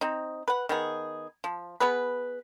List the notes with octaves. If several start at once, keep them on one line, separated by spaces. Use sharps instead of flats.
C4 D#4
B4 F#5
D#3 B3 G#4
F3
B3 G#4 B4